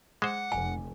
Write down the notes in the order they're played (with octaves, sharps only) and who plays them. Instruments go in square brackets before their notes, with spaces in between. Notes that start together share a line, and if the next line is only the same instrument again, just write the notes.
[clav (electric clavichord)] G#3 C5 [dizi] F#5 [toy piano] D6
[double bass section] F1 [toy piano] G#5